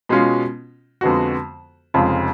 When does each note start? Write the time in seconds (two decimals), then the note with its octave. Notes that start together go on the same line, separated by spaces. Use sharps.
0.09 B2 G#3 C#4 F4
1.01 F2 D3 G#3 B3 F#4
1.94 F1 F2 C#3 F3 G#3